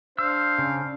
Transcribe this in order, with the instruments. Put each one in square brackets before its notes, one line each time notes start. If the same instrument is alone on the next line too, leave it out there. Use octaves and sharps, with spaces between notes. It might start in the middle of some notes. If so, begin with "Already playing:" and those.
[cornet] D4 [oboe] C5 [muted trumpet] F5 [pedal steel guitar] E6
[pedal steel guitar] C#3